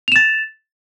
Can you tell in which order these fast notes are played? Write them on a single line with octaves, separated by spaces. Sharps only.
F7 E7 A6